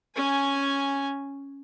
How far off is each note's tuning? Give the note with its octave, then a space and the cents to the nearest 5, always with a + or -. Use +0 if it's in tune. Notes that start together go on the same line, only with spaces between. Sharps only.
C#4 +0 G#5 +0